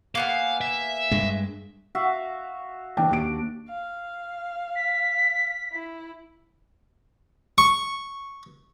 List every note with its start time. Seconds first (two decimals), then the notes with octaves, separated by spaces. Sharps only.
0.15 A#3 B3 G#4 F5
0.61 E5
1.11 G2 G#3
1.95 F#4 E5 F5
2.97 E3 D4 G5
3.10 D#2 D7
3.69 F5
4.75 B6
5.72 E4
7.58 C#6